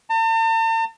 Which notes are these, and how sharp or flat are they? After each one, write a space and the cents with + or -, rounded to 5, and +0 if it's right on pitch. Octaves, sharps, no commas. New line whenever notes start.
A5 +45